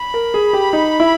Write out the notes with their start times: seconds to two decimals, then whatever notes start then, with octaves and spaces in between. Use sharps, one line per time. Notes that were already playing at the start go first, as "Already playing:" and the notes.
Already playing: B5
0.14 A#4
0.34 G#4
0.53 G4
0.73 D#4
1.00 E4